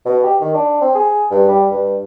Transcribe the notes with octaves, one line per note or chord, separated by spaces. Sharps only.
B2
G4
D#3
D4
C4
G#4
G2
G3
G2